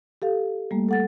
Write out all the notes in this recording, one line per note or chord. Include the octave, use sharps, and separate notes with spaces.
G4 A4 F5
G3 A3 A#3
A4 F#5 A6